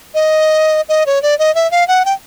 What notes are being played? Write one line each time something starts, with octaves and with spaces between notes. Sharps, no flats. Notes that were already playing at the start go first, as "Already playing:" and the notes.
D#5
D#5
C#5
D5
D#5
E5
F5
F#5
G5